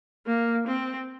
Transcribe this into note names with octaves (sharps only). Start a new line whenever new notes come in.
A#3
C4